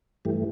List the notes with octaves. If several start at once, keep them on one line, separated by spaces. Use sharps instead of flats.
G2 E3 A3 G4